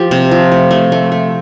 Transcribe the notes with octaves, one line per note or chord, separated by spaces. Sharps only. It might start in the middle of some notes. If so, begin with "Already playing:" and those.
Already playing: F3 G4
C3
F3
A3
A3
A3
A3